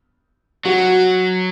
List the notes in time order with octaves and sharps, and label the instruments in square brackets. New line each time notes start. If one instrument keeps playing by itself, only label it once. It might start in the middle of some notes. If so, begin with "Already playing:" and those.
[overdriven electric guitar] F#3 [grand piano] F#4